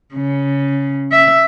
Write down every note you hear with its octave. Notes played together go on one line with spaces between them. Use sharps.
C#3
E5